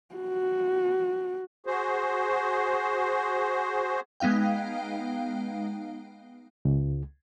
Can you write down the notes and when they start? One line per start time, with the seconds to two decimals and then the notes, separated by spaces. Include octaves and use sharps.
0.15 F#4
1.67 F#4 G#4 C5
4.20 G#3 B3 D#4 F5 G5
6.65 C#2